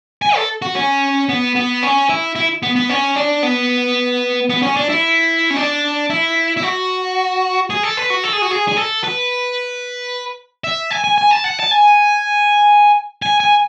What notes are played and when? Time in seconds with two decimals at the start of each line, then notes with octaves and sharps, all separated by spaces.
0.22 G#5
0.36 A4
0.62 F#4
0.75 C#4
1.29 B3
1.55 B3
1.82 C#4
2.09 E4
2.35 E4
2.63 B3
2.76 B3
2.89 C#4
3.16 D4
3.43 B3
4.49 B3
4.62 C#4
4.76 D4
4.89 E4
5.50 C#4
5.57 D4
6.10 E4
6.57 E4
6.63 F#4
7.70 G#4
7.83 A4
7.97 B4
8.10 F#4
8.24 A4
8.33 G#4
8.42 F#4
8.51 G#4
8.68 G#4
8.77 A4
9.04 B4
10.64 E5
10.91 G#5
11.04 G#5
11.18 G#5
11.31 A5
11.44 F#5
11.60 A5
11.71 G#5
13.22 G#5
13.40 G#5